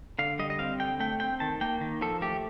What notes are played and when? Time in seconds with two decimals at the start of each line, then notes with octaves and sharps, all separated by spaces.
0.19 D3 F5
0.39 G3 D#5
0.50 D#5
0.59 C4 F5
0.80 D3 G5
1.00 A3 G5
1.20 C4 G5
1.40 D#3 A5
1.61 A#3 G5
1.81 D#3
2.01 F3 A4
2.22 A3 G4